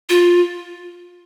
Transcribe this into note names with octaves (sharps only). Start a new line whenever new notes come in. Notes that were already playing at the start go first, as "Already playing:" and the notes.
F4